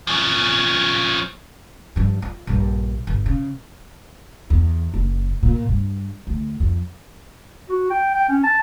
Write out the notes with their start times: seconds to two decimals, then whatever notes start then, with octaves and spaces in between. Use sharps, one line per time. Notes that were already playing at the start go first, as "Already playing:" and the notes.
0.07 F3 C#4
1.96 G2 F3
2.22 F4
2.47 A#1 G2
3.07 G1
3.26 C#3
4.50 E2
4.94 F#1
5.43 A#2
5.69 G2
6.27 D2
6.60 F2
7.69 F#4
7.90 G5
8.14 G5
8.29 C#4
8.44 A5